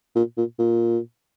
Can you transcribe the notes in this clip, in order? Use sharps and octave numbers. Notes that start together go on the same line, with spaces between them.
A#2
A#2
A#2